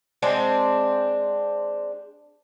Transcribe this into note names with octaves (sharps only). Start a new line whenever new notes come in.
G#3 C4 D4 A5